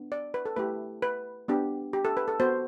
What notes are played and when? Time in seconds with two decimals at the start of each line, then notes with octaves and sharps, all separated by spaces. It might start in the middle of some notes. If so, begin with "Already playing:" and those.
Already playing: B3 D4
0.12 D5
0.34 B4
0.46 A4
0.56 A3 E4 G4 B4
1.02 B4
1.48 B3 D4 G4
1.93 G4
2.05 A4
2.17 B4
2.28 A4
2.40 B3 F#4 C5